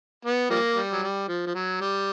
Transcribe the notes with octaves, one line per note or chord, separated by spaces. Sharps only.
B3
F3 G3 A#3
G3
F#3
G3
F3
F3
F#3
G3